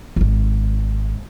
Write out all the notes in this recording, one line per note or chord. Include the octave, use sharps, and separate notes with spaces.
D#1 G#1